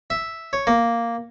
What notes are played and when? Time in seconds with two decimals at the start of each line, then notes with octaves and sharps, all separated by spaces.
0.10 E5
0.53 C#5
0.67 A#3